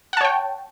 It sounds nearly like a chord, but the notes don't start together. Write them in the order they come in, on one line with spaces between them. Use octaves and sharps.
F#5 A5 C#5 G5